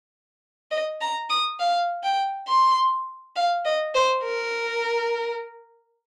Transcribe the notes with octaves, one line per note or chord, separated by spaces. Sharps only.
D#5
A#5
D#6
F5
G5
C6
F5
D#5
C5
A#4